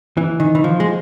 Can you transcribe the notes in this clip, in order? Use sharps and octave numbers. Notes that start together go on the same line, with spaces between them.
E3
D#3
E3
F3
G#3